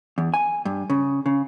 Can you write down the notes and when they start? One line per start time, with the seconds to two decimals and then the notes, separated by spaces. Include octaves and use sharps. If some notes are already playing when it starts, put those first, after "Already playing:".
0.18 E2
0.34 G#5
0.65 G2
0.90 C#3
1.26 C#3